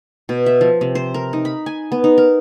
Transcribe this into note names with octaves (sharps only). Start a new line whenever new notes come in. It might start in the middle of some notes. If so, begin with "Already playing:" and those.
B2
E5
F3
C3
C5
A#4
D#4
B5
G#5
B3
D#4
A#4